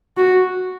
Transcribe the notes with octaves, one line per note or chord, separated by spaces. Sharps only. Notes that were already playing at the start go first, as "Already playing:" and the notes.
F#4